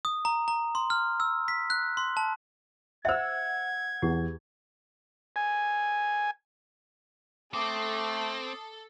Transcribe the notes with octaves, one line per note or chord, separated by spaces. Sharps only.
D#6
A#5
A#5
C6
F6
E6
B6
F#6
C6
A5
C5 E5 F#5 E6 G#6
E2 G4
G#5
A3 C4 A4 D6 D#6 C7